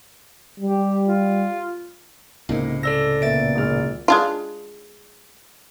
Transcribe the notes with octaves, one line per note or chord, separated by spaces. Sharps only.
G3 G4
F4
C#2 A2 C3 A#3 D#4
A4 D5 E6 A#6
A#2 B3 C#5 E5 A6 D7
G#1 G#4 F6
G#3 D4 F4